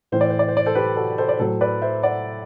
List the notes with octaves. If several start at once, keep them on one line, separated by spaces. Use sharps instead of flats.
A2 E3 C5
D5
C5
D5
C5
D5
A4 C5
G4 B4
F#4 A4
A4 C5
D5
A2 F#3 A4 C5
B4 D5
C5 E5
D5 F#5